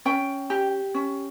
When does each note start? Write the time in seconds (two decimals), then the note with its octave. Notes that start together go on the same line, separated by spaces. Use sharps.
0.05 C#4 G5
0.50 G4
0.94 C#4